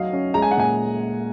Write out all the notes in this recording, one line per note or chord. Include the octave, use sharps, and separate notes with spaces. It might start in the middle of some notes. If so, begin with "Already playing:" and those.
Already playing: F#3 D#5 F5
C#4
G#3 A#5
G#5
F#5
A#2 G#5